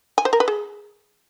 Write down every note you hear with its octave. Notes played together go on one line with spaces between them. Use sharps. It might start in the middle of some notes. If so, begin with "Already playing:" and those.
G#5
C5
A#4
B4
G#4